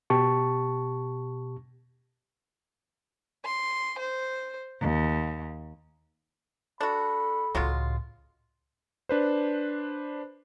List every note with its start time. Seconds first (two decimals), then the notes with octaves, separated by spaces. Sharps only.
0.10 B2 G4 A5 C#6
3.44 C6
3.98 C5
4.80 D#2
6.81 D4 F#4 A4 B5
7.55 C#2 A2 F#3 G#3 F4
9.09 D4 B4 C5